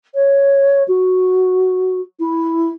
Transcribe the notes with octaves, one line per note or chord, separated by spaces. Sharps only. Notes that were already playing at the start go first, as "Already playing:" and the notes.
C#5
F#4
E4